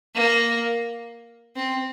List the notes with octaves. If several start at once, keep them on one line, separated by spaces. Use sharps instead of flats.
A#3
C4